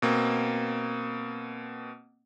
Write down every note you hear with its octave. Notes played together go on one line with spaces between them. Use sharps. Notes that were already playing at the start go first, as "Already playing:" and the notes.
B2 A#3 C4